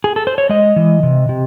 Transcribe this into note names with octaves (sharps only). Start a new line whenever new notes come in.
G#4
A4
C5
C#5
G#3 D#5
E3
C3
C3